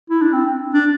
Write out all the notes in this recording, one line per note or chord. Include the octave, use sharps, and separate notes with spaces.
E4
D4
C4
D4